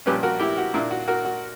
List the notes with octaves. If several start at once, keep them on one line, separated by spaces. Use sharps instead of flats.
A#1 A#2 G3 C#4 G4 B4
F#4 A#4
E4 G4
F#4
A#2 A#3 D4 E4
F#4
F#4 A#4
F#4